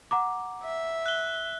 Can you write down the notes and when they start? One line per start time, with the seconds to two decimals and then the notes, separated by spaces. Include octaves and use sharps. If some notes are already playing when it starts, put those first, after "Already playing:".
0.11 F#5 A#5 D6
0.63 E5
1.06 F#6 G7